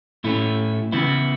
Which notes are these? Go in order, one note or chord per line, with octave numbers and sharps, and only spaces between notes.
A2 A3 C#4 E4
C#3 E3 B3 E4